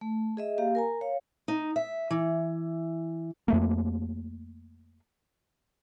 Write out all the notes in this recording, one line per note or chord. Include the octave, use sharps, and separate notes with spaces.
A3
G#4 D#5 E5
A#3 G4 F5
A#4 G#5 A#5
C#5 F5
D#4
E5
E3
F2 A3 A#3